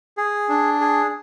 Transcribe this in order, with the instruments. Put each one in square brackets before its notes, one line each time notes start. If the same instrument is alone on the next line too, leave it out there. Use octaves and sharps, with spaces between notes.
[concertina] G#4
D4
G#4